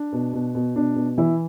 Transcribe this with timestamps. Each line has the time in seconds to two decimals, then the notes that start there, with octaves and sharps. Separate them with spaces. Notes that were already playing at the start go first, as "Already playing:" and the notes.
Already playing: D4
0.12 B2
0.33 B2
0.55 B2
0.75 B2 D4
0.96 B2
1.18 E3 E4